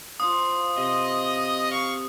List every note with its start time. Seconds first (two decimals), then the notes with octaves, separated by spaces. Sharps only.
0.20 F4 C5 F5 D#6
0.77 C3 D#5
1.72 F5 C#6